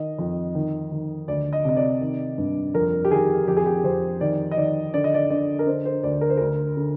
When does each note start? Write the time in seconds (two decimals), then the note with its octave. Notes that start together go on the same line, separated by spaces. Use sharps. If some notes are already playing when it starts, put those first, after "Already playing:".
Already playing: D#3 D#5
0.19 F2
0.55 D#3
0.92 D#3
1.28 D2 D5
1.53 D#5
1.65 C3 D#5
1.77 D5
2.01 D#3
2.38 G2
2.74 F2 A#4
3.05 G4
3.11 D#3 G#4
3.48 F2 G4
3.57 G#4
3.66 G4
3.84 F2 C5
4.21 D#3 D5
4.51 D#5
4.57 D#3 D5
4.94 D3 D5
5.04 D#5
5.14 D5
5.30 D3 D5
5.59 A#4
5.67 D3 C5
5.85 C5
6.04 D2 D5
6.21 A#4
6.29 C5
6.37 D2 A#4
6.77 D3